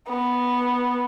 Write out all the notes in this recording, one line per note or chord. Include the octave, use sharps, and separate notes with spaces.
B3